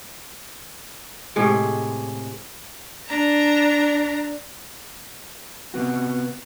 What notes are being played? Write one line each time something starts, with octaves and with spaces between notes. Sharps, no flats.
A2 C3 G#3
D4 A#5
C3 B3 F#4